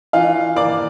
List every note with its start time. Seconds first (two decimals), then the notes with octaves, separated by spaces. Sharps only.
0.13 E3 F4 F5
0.56 A#3 D5 D6